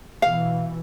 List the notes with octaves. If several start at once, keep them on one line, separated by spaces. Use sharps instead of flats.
B2 E3 F5